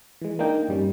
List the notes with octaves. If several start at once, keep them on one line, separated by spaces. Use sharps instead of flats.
E3 G#3
A#3 D4 D#4 G5
G2 G3 C#4